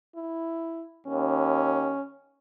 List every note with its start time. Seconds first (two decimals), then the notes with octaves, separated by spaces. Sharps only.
0.16 E4
1.07 D#2 C#4